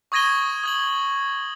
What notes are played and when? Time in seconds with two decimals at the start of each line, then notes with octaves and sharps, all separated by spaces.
0.12 C#6 D#6 G#6 A#6 D#7 G7
0.64 D#6 G#6 F#7